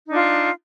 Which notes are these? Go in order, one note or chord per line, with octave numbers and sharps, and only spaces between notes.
D4 D#4 F4